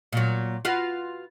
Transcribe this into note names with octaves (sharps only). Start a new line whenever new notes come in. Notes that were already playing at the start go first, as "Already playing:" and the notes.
A#2 F#3
F4 F#4 B4